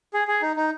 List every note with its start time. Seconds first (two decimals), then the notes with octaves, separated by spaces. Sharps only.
0.14 G#4
0.28 G#4
0.42 D#4
0.56 D#4